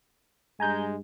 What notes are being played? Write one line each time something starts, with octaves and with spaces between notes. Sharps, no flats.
G2 G#3 G#5 A#5 G6